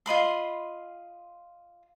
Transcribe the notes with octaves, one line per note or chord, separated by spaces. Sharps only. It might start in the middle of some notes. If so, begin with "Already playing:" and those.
F4 D#5 B5 C6